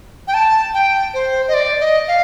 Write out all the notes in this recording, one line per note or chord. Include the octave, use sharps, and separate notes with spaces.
G5
A5
G5
C5
D#5
D5
D#5
F5